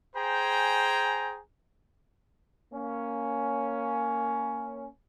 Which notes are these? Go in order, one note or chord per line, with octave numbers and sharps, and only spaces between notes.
G#4 C5 G5 G#5 A#5
A#3 C#4